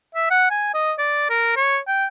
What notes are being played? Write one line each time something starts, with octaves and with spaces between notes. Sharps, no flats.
E5
F#5
G#5
D#5
D5
A#4
C#5
G5